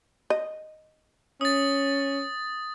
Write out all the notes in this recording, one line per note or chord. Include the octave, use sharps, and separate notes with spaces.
D#5
C#4 D#6 A6